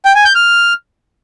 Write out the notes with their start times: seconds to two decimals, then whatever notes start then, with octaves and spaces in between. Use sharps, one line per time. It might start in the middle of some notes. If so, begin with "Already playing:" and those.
0.05 G5
0.15 G#5
0.25 G6
0.35 F6